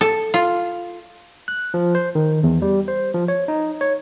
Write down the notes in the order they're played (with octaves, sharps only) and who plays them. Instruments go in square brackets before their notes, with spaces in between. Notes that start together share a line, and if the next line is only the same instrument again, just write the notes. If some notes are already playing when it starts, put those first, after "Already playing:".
[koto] A4
F4
[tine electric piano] F#6
F3
C5
D#3
E2
G3
C5
F3
C#5
D#4
C#5